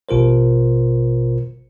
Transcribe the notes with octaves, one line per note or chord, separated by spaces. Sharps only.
A1 B2 F4 A#4 C5